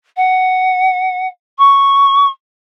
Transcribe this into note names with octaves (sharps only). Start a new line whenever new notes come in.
F#5
C#6